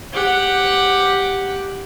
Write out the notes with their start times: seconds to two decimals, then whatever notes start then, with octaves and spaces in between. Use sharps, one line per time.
0.14 G4 F#5